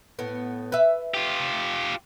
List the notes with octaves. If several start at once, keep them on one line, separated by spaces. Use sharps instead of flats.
A2 B3
B4 E5
F4 G4